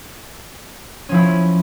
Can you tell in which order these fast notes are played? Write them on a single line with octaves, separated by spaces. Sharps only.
C#4 F3 E4